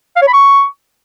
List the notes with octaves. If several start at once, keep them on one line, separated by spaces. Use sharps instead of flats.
F5
C#5
B5
C#6